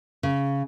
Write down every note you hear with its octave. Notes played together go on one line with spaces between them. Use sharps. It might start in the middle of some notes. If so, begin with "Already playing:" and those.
C#3